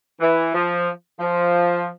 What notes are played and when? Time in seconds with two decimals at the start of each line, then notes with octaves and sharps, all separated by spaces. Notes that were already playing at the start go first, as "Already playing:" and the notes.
0.21 E3
0.54 F3
1.20 F3